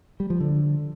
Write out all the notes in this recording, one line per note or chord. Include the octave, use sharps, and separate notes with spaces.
G3
F3
D3